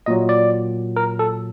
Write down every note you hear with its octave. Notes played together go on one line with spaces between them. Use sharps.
A#2 F#3 D#5
D5
A#4
A4